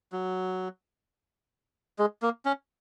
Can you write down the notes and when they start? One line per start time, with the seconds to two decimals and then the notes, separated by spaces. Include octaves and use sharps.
0.12 F#3
1.99 G#3
2.22 A#3
2.45 C#4